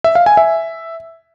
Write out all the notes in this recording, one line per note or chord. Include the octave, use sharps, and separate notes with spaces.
E5
F5
G#5
E5